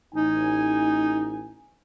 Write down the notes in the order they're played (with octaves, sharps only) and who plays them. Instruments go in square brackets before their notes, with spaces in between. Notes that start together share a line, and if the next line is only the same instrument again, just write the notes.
[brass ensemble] A1 G#5 [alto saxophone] D#4